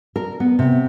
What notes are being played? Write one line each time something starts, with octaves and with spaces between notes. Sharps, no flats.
A#4
B3
C3